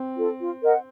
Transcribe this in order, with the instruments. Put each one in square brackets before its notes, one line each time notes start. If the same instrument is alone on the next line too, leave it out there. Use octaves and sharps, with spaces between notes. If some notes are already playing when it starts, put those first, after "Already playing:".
Already playing: [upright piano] C4
[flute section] F4 A4
F4
A#4 D#5 F#5